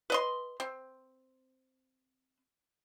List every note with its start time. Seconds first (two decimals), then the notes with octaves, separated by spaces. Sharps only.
0.10 B4 D#5 C6
0.60 C4